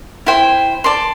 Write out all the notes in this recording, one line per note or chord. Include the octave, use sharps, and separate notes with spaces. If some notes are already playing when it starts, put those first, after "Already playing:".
E4 C5 G5
D5 A5 C6